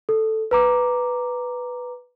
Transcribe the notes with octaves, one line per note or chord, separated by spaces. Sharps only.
A4
B4 A#5 D6